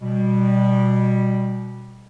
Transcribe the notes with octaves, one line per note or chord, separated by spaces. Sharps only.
B2 G3